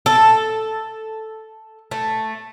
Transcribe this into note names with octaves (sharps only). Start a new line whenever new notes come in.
A4
A3